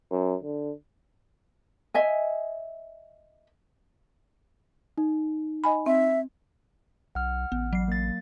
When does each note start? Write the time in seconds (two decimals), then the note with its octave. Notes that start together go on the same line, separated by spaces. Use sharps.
0.11 F#2
0.43 D3
1.94 D#5 E5 G#5
4.98 D#4
5.64 D#5 G#5 B5
5.86 C4 E5
7.15 B1 F#5 F6
7.52 A1 B3
7.73 F#3 C7
7.88 A#3 A6